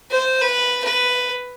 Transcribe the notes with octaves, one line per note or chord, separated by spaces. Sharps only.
C5
B4
B4